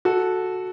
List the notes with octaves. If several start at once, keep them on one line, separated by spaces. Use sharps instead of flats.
F#4 A4